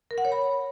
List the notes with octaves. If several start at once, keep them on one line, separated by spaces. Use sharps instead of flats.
A#4
F#5
C#5
B5